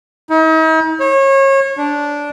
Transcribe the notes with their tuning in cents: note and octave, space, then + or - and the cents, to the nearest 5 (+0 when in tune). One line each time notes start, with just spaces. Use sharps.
D#4 +45
C#5 -30
D4 -10